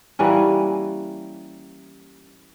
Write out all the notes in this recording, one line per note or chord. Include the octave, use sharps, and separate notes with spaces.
E3 G3 A#3 C#4